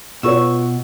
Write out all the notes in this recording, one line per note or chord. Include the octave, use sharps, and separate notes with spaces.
B2 F4 B4 C#5 C#6 E6